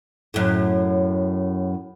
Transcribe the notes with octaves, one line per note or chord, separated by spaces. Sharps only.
F#2 A2